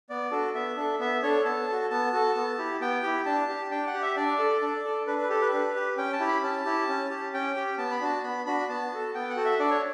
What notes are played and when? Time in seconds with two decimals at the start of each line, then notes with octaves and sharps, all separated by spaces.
0.10 B3 D5
0.31 D4 F#4 A4
0.54 B3 E5
0.77 D4 A4
0.99 B3 E5
1.23 D4 A4 C#5
1.45 B3 A5
1.68 F#4 A4
1.90 B3 A5
2.13 F#4 A4
2.35 B3
2.58 E4 G4
2.80 B3 G5
3.03 E4 G4
3.26 D4 A5
3.49 G4
3.71 D4 G5
3.87 F#5
3.94 G4
4.02 E5
4.16 D4 D5
4.39 A4
4.62 D4
4.85 A4
5.07 D4 B4
5.18 B4
5.29 G4 A4
5.41 B4
5.53 D4
5.76 G4
5.97 C#4 G5
6.13 A5
6.20 E4 G4
6.28 B5
6.43 C#4 A5
6.65 E4 G4
6.89 C#4
7.10 G4
7.34 C#4 G5
7.56 G4
7.78 B3 A5
7.91 B5
8.01 D4 F#4 A5
8.23 B3 B5
8.46 D4 F#4 B5
8.69 B3 A5
8.92 F#4 A4
9.15 B3 G5
9.30 F#5
9.36 F#4 A4
9.45 E5
9.59 D4 D5
9.71 C#5